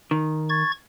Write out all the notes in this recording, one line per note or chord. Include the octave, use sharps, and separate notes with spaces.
D#3
C#6 G#6 A6